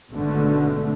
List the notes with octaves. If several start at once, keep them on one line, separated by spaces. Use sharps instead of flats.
G#1 B2 D3 A3